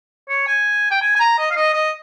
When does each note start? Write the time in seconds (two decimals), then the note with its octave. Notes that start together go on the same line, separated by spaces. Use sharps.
0.29 C#5
0.47 G#5
0.91 G5
1.02 G#5
1.16 G#5
1.20 A#5
1.38 D#5
1.51 F5
1.56 D#5
1.74 D#5